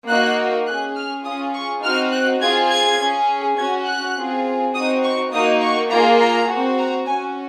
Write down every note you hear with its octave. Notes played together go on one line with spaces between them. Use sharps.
A#3 D#4 F#4 F#6
C#4 G#4 F#6
F6
C#4 F4 G#4 D#6
C#6
C4 D#4 F#4 F6
F#6
C4 F4 G#4 G#6
G#6
C#4 G#4
C#4 F#4 G#6
F#6
C4 F4 G#4
C4 D#4 F#4 D#6
C#6
A#3 D#4 F#4 D#6
C#6
A#3 F4 G#4 A#5
A#5
C4 F#4
A#5
C#4 F#4 G#5